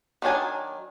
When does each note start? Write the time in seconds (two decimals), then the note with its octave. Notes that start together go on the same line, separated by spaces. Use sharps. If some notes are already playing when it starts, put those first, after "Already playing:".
0.22 D#3 F#3 D4 G#5